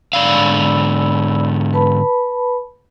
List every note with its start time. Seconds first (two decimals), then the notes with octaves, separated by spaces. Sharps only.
0.13 G#2 D3 D5 F5 B5 E6
1.73 B4 A5 B5